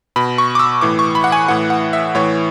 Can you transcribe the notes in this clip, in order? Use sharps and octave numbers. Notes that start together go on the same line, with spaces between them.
B2 B5
C#6
D6
E6
A2 E3 D6
C#6
B5
F#5
G#5
A2 E3 F#5
F#5
E5
A2 E3 C#5